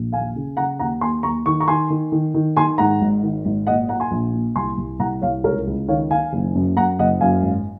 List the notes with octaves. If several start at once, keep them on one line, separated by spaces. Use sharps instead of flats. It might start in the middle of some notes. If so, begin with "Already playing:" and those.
Already playing: A#1
D#2 F5 G#5
C#3
C#3 F#5 A#5
D#2 F#5 A#5
D#2 G#5 C6
D#2 A#5 C#6
D#3 C#6
A#5 C#6
D#3 G#5 C6
D#3
D#3
D#3
D#3 G#5 C6
G#2 F#5 A#5
G#1
D#3
G#1
A#2 D#5 F#5
A#2 F#5 A#5
G#5 C6
A#1
A#2
C2 G#5 C6
C2
C2 F#5 A#5
C2 C#5 F5
C#2 A#4 C#5
C#2
D#3 C#5 F5
D#3 F5 G#5
F#1
F#2
F#2 F#5 A#5
F#1 D#5 F#5
F#2 F5 G#5
G#1